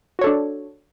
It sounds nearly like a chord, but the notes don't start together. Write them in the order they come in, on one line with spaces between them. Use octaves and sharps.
F#4 C#5 A4 D4